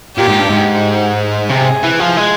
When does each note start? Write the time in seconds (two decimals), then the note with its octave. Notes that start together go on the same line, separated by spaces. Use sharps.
0.17 A#2 G4
0.28 G#2
0.39 G2
0.49 G#2
1.50 C3 G#4
1.83 E3
2.00 F3
2.17 G#3